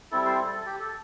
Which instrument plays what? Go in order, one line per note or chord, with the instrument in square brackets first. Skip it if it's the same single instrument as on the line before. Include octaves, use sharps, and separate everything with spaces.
[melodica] G3 C4 E4 A4
A4 C5
A4
A4
G4
A4